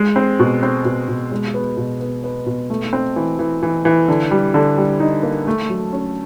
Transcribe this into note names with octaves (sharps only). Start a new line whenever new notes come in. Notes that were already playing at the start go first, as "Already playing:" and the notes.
Already playing: G#3
C4
B2
C4
B2
B2
G#3
B3
B2
B3
B3
B2
A3
C4
E3
E3
E3
E3
D3
G3
D3
G3
D#4
A#3
A3
F#3
C#4